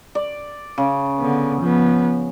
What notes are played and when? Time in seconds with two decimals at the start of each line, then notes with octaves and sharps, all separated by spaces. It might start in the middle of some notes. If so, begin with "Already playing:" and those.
0.15 D5
0.78 C#3
1.18 D3 B3
1.60 F3 B3